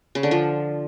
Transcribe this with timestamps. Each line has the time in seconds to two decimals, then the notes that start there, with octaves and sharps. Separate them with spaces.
0.15 C#3
0.23 D3
0.31 F3